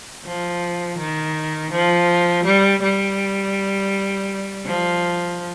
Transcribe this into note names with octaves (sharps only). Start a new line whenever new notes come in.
F3
D#3
F3
G3
G3
F3